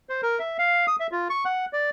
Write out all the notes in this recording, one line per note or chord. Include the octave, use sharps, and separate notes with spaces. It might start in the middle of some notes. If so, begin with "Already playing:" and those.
C5
A#4
E5
F5
D#6
E5
F4
C#6
F#5
D5